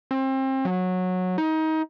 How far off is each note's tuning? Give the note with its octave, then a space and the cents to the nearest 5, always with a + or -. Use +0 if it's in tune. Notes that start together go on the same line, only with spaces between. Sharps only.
C4 +30
F#3 -15
D#4 +25